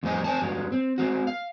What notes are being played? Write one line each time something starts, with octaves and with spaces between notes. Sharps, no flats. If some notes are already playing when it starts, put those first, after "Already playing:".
F2 A2 G3 C5 D#5 G#5
C4 C5 G#5 A5
G2 F#3 G#3
C4
G#3 C4 F#4
F5